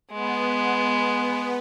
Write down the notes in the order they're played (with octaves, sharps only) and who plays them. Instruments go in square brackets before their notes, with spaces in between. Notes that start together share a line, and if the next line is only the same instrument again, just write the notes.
[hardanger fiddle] G#3 [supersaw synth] B3